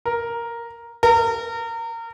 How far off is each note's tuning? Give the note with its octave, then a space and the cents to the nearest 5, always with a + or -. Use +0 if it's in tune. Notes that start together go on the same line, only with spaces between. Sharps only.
A#4 +0
A#4 -30